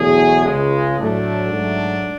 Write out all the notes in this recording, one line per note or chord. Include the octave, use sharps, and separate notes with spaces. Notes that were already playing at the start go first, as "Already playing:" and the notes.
Already playing: E2 B2 F#3 A3 G#4
C#2 C#3 G#3
A2 F#3 A3 D4
G#2 F#3 A3